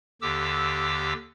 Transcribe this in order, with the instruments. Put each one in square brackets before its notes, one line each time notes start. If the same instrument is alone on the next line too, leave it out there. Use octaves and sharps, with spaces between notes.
[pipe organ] D#2 D3 G4 D6 E6